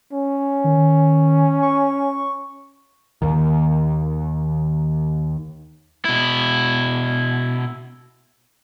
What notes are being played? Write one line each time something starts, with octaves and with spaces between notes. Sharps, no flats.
C#4
D#3
C#6
D#2 D#3
B2 E4